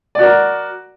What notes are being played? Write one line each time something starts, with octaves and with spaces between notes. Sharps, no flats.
F#4 A#4 D5